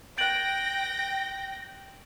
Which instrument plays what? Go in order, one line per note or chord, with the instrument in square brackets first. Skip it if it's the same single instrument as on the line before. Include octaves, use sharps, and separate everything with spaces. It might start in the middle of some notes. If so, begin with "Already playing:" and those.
[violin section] G5 A#6 [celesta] F#6 G6 [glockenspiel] A6 D7 F#7